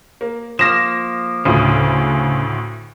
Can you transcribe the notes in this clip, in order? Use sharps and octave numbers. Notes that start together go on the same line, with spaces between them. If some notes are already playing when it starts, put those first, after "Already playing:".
A#3
F3 A#3 A#6 E7
D2 A2 C#3